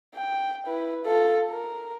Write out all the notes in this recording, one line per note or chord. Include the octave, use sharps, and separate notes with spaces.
G5
E4 B4
F4 A4
A#4